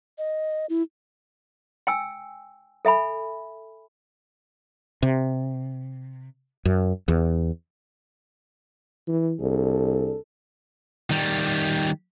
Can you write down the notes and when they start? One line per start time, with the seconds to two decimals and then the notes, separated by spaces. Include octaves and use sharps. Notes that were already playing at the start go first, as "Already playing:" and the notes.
0.18 D#5
0.69 E4
1.87 G5 G#5 E6
2.85 A4 E5 G#5 B5
5.03 C3
6.65 F#2
7.08 E2
9.07 E3
9.40 C2 D4 G#4 A4
11.11 D#3 G3